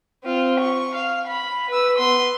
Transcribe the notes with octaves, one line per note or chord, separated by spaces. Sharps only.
C4 F4
C#6
F5
B5
B4 E6
B3 C6